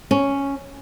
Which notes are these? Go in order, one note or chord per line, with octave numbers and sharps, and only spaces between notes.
C#4